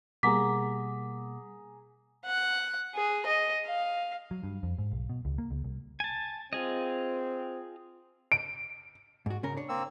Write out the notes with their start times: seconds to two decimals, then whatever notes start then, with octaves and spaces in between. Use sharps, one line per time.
0.23 B2 G3 A#3 G#4 F#5 A#5 D6 B6
2.26 F#5
2.95 G#4
3.26 D#5
3.65 F5
4.31 F#3
4.44 G2
4.63 F2
4.78 G#2
4.92 B1
5.10 B2
5.25 C#2
5.38 A#3
5.51 C#2
5.64 C2
6.00 G#5 A5
6.53 C4 F4 G#4 D#5
8.32 D7
9.26 G#2 F#4
9.43 C#3 C#4 A#4
9.57 D4 C#5
9.69 A#3 C4 E6